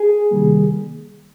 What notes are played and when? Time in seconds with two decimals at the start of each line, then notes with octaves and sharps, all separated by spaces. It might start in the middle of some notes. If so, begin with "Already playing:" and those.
Already playing: G#4
0.31 C3 D#3 G3 A#3